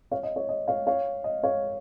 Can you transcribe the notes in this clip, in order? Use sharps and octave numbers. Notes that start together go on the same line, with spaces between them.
C#5 F5
D#5
C#5
D#5
C#5 F5
C#5 F5
D#5
C#5 F5